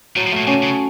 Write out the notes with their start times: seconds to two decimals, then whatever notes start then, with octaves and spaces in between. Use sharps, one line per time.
0.16 A2 F#3
0.27 F3
0.32 A#2 A3
0.47 C3 C#4
0.63 C#3